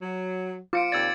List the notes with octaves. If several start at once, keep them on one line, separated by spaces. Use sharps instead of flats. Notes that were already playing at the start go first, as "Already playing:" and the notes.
F#3
F4 D6 C#7 D7
D#2 C4 D5 E6 G#6 A6